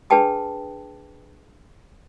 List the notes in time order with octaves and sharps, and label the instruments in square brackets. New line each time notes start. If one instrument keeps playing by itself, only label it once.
[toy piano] D4 G#4 B4 G5 A5 D#6